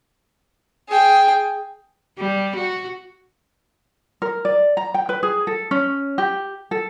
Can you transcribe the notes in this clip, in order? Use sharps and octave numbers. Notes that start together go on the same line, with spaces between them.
G#4 G5
G3
F#4
A#4
D5
A#5
G5
B4
G#4
A4
C#4
G4
A4